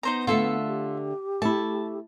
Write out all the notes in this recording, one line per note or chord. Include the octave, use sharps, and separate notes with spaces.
B3 D#4 C5 A#5
D3 A3 F4 A4 E5
G4
A3 E4 A5